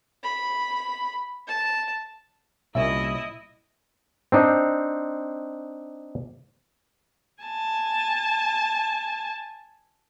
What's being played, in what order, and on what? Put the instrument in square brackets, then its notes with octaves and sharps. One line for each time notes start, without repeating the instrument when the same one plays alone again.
[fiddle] B5
A5
[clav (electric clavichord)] C2 C#4 C#5 [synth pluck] A#2 [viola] E4 D#5 [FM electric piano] E5
[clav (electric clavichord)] C4 D4 D#4 C5
[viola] G#5 A5